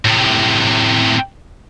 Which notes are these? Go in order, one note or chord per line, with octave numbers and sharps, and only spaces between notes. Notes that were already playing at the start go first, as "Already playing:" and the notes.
A2 C3